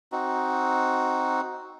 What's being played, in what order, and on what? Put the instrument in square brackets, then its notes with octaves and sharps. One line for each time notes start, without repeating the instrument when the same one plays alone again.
[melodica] C4 D#4 F#4